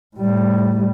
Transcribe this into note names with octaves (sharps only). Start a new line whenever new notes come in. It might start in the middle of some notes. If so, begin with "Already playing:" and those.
A2 G3